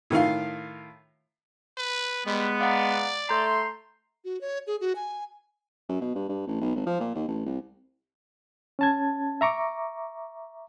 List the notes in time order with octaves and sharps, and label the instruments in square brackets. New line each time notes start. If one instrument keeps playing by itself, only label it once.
[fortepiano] A2 D#3 F4 F5
[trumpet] B4
[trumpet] G3 [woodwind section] G#3 B3
[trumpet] D5 [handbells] F5 F#5 A#5
[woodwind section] A3 E5 C6 [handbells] A#5 G6
[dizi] F#4
C#5
G#4
F#4
G#5
[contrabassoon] F#2
B2
G2
G2
A1
B1
G#1
F3
A#2
D#2
A1
C2
[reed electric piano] C#4 A5 G#6
E5 A#5 C#6 D6